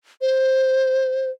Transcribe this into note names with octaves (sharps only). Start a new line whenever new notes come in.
C5